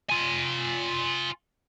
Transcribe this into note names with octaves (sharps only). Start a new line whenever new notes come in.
F4 G#5